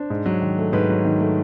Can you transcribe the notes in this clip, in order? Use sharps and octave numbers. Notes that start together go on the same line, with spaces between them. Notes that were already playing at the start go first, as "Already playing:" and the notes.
Already playing: D4 C5
G#2
F#3
D#3
A3
G#2 B4
F#3
D#3
A3